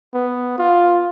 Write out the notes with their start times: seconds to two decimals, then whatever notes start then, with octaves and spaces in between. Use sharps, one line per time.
0.14 B3
0.58 F4